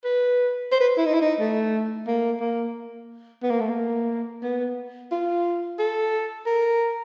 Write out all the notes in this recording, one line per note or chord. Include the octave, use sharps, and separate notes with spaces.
B4
C5
B4
E4
D#4
E4
D#4
A3
A#3
A#3
B3
A#3
A3
A#3
B3
F4
A4
A#4